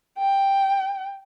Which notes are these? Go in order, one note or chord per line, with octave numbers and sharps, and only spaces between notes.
G5